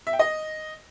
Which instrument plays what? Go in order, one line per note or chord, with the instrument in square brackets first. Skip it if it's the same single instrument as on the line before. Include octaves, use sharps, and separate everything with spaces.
[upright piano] E5
G5
D#5